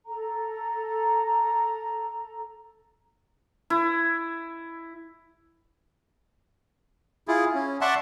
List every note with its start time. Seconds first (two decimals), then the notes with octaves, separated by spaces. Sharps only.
0.06 A4 A#5
3.70 E4
7.28 E4 F4 G#4
7.55 C#4
7.81 D5 E5 F#5 A5 C6 C#6